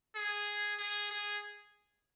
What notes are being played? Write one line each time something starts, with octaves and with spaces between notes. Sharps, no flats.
G#4
G#4
G#4